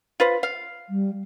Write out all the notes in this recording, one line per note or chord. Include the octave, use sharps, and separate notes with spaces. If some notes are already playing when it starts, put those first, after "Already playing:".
F4 B4 C5
F5
G3